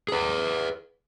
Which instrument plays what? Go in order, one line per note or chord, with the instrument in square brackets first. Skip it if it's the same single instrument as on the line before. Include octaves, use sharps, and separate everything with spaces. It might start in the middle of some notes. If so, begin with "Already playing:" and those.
[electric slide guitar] G#4 B4